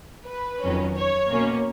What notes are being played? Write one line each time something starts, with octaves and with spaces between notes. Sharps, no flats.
B4
F2 D#3 F#3 C#4
C#5
B2 A#3 C#4